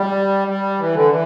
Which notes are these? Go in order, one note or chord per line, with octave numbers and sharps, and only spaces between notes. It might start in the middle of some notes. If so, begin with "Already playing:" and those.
Already playing: G3
G3
E3
D3
E3